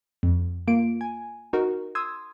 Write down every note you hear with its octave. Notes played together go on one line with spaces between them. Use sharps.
F2
A#3 F4 D7
G#5
D#4 F#4 A#4
C6 D#6 E6 G#6